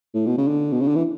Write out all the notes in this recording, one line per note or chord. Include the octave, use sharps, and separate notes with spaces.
A2
B2
C#3
D3
B2
C#3
D3
E3